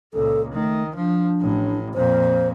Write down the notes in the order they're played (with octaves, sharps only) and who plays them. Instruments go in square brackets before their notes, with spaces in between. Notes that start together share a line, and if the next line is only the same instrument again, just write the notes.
[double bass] C#2 A#2 [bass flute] A4
[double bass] D#3 [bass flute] A3
[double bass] F3 [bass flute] D4
[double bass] A1 A2
[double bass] F2 A#2 [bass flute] C5